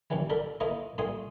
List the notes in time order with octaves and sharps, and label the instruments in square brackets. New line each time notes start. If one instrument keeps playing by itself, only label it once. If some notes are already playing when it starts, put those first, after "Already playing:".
[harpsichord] A#1 D#2 C#3 E3 G3
D3 D4 A4 A#4 B5
A3 A#3 E4 F4 B4 D#5
G2 A#2 A3 G#5 C6 D#6